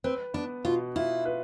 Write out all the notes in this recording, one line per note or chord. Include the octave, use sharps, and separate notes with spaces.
C4 B4
B3 D4
B2 F4
E4 F4
B4